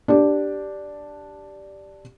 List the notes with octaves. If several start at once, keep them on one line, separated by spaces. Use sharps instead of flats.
D4 G4 D5